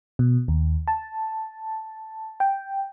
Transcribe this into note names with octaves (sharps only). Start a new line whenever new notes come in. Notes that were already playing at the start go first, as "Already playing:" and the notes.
B2
D#2
A5
G5